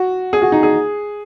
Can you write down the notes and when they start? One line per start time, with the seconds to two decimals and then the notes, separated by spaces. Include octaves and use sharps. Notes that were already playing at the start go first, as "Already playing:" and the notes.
Already playing: F#4
0.33 G#4
0.42 F#4
0.52 D#4
0.63 G#4